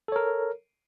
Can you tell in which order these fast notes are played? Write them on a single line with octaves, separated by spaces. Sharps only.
A4 C#5 A#4